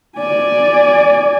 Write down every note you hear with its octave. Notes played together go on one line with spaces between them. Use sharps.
D5 G#5